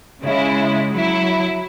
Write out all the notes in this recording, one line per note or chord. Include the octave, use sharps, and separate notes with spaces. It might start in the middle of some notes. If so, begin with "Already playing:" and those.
C#3 G#3 E4
F#3 E4